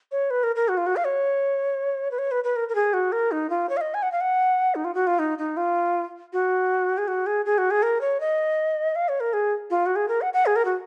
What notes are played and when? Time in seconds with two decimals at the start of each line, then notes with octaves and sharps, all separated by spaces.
0.12 C#5
0.30 B4
0.43 A#4
0.56 A#4
0.68 F#4
0.77 F4
0.86 F#4
0.96 F5
1.05 C#5
2.11 B4
2.19 C#5
2.31 B4
2.44 B4
2.56 A#4
2.69 A#4
2.75 G#4
2.94 F#4
3.12 A#4
3.32 D#4
3.50 F4
3.69 C#5
3.77 F5
3.81 D#5
3.94 G#5
4.03 F#5
4.12 F5
4.21 F#5
4.75 D#4
4.84 F4
4.95 F#4
5.07 F4
5.19 D#4
5.38 D#4
5.57 F4
6.33 F#4
6.98 G#4
7.08 F#4
7.26 G#4
7.46 G#4
7.58 F#4
7.71 G#4
7.83 A#4
8.01 C#5
8.20 D#5
8.96 F5
9.09 C#5
9.20 A#4
9.33 G#4
9.70 F4
9.86 F#4
9.96 G#4
10.08 A#4
10.21 F#5
10.33 F#5
10.46 G#4
10.56 A#4
10.65 F#4